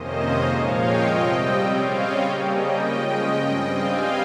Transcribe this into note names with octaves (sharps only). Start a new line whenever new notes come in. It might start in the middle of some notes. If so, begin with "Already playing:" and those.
Already playing: F2 C3 D#3 A#3 C#4 C5 D#5
A#2 F3 G#3 C#5 F5
D#5 G5
C3 G3 C4
D#5 G5
C#3 G3 C4 C#5 F5
D#5 G5
C#3 G3 A#3 C#4
D#5 G5
C#3 F3 G#3 C#4 D#5 G5
G2 G3 C4
F5 G#5